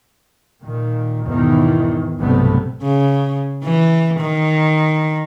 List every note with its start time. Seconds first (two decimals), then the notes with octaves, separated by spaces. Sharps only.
0.64 A#2 D#3
1.25 E2 G#2 B2 D#3 E3
2.19 B1 G2 C3 A3 B3
2.82 C#3
3.64 E3
4.20 D#3